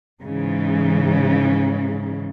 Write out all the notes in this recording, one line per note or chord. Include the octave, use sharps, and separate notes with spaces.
G#2 C#3 E3